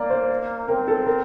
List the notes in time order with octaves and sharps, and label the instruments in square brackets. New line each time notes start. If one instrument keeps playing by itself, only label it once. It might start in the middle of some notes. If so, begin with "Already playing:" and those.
Already playing: [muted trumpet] A#3 [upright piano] D5
[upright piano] C5
[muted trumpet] C4 [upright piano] A#4
[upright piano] A4
A#4